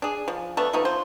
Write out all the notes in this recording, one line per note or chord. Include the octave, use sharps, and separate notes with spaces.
D4 G#4
F3
A3 B3 D4 A5
F3 A3 B3 D#4
F4 C5